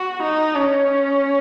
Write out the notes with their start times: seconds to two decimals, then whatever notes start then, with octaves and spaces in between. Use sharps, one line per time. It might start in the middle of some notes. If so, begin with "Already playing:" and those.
Already playing: F#4
0.23 D#4
0.56 C#4